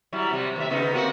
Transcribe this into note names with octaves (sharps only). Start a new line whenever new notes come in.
F#3 G3 E4
C3 G3
D#2 A2 E5
C#3 B3 D#4
A#3 C4 F#4